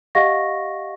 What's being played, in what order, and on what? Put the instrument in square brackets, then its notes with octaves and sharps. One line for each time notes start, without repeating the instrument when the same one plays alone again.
[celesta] G4 D#5 F5 F#5 C#6 A#6